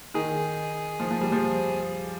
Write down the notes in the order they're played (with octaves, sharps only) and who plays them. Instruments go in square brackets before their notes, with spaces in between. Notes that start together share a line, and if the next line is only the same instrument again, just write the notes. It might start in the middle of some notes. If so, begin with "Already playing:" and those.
[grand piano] D#3 [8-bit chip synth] G#4
[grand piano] F3
F3
G3
F3